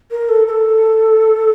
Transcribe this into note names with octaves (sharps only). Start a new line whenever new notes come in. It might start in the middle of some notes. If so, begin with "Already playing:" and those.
A#4
A4
A#4
A4